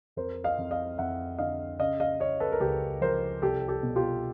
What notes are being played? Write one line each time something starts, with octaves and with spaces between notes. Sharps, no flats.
F2 A#4 C5
D#5 F5
F2
D#5 F5
F2 E5 F#5
D3 D#5 F5
C#3 D#5 F5
D#5 F5
C#3 C#5 D#5
A4 B4
A#4
C#2 G4 A4
F3 A#4 C5
C2 G4 A4
G4 A4
B2
F4 G4